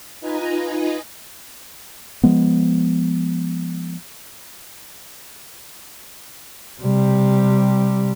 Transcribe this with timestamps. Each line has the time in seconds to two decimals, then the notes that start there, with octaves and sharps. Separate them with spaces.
0.20 D#4 F4 B4 D#5 G#5 A#5
2.23 F3 G#3 B3
6.81 C3 G3